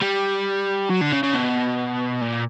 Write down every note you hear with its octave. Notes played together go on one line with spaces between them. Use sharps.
G3
F#3
D3
C#3
C#3
B2
A#2